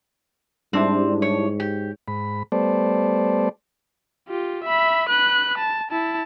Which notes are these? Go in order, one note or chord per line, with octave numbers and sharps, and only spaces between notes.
G#2 G3 C4 D4 E4
C#5
G4
G#2 B5
G3 A3 B3 A4 C5 D5
F4 G4
E5 B5
B4 F#6
A5
E4 A5